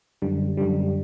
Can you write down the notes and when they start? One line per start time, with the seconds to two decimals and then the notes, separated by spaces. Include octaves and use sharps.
0.22 F#2 D3 G3
0.57 F#2 D3 G3